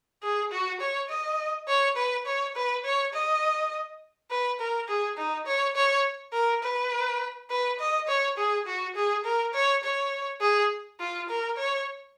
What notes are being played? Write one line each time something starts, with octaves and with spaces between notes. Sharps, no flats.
G#4
F#4
C#5
D#5
C#5
B4
C#5
B4
C#5
D#5
B4
A#4
G#4
D#4
C#5
C#5
A#4
B4
B4
D#5
C#5
G#4
F#4
G#4
A#4
C#5
C#5
G#4
F4
A#4
C#5